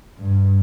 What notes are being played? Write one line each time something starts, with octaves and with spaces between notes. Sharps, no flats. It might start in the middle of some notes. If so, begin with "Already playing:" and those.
G2